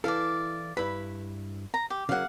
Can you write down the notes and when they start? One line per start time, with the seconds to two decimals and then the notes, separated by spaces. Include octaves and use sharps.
0.04 E3 E4 A4 D5 F5
0.77 G2 E4 B4 B5
1.74 A#5
1.90 G4
2.09 C#3 F#3 A#3 F5 F#5